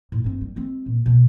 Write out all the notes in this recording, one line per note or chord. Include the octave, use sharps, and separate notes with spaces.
A2
G2 C4
G3
G#3 C4
A#2
B2